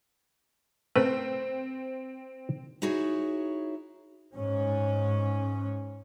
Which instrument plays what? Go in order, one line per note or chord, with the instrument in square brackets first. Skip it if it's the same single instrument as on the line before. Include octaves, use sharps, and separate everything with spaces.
[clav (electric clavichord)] A3 A#4 B4 [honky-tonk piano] C4
[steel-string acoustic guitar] D#4 E4 F#4 G#4 C#5
[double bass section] G#2 C#4